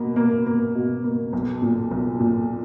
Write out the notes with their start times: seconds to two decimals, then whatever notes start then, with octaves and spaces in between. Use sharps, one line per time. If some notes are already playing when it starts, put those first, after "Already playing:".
Already playing: B2 A#3
0.16 A#3
0.46 A#3
0.75 B2
1.04 A#3
1.33 B1
1.62 A#2
1.91 B1
2.20 A#2